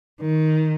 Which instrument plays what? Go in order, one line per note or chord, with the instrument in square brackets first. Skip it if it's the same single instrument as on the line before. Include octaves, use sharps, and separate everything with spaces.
[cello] D#3